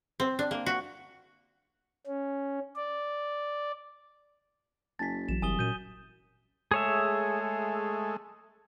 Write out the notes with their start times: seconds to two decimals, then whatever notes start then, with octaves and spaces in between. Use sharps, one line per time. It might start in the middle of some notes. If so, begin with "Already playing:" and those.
0.20 C4
0.39 D4
0.51 A#3
0.66 F#4
2.06 C#4
2.76 D5
4.99 F#1 G#5 A5 A6 B6
5.29 A#1 E3 F#3 E7
5.42 F#1 C2 G#5 D#6 G7
5.59 F#2 A#2 G6 D#7
6.71 G#3 A3 G#4 C#5 E5